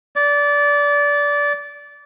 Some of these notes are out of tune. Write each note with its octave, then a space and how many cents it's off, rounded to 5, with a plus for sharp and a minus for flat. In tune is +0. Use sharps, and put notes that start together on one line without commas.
D5 -20